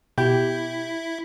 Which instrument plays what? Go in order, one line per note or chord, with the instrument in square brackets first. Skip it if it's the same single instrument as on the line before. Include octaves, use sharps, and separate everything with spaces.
[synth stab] B2 G4 G6 [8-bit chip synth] E4